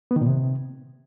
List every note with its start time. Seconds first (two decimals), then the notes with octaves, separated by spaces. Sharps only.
0.11 B3
0.16 D#3
0.21 A#2
0.27 C3